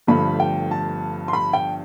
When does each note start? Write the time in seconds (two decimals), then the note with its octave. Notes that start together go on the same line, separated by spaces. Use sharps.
0.07 G1 G2 F3 A3 B5
0.40 G5
0.71 A5
1.28 C6
1.33 B5
1.53 G5